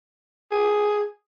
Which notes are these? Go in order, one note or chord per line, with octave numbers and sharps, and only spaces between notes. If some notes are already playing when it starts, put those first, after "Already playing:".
G#4